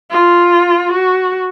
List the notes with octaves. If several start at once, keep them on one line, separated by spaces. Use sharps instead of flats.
F4
F#4